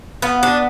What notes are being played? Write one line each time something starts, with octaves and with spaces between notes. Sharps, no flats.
B3 F4
D4